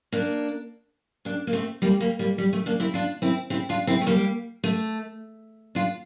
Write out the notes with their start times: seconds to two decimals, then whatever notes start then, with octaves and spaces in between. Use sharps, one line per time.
0.12 A#3 D4
1.25 A#3 D4
1.47 A#3
1.53 A3 C4
1.82 G3 A#3
2.01 G3 A#3
2.19 G3 A#3
2.38 G3
2.53 A3
2.66 A#3 D4
2.80 C4 E4
2.94 D4 F4
3.22 C4 E4
3.50 C4 E4
3.69 D4 F4
3.87 C4 E4
4.01 A3
4.07 G3 A#3
4.64 A3
5.75 D4 F4